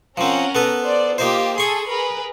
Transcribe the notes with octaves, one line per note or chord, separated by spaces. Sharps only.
F3 C4 C#4 A#4 F#5
B3 A4 B4
C5 D5
A#3 D#4 F4 G4 C5
G#4 A4 C6 C#6
G#4 A#4 B4